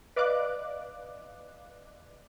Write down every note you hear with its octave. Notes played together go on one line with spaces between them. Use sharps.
B4 D5 D#5 F5 D6 F#6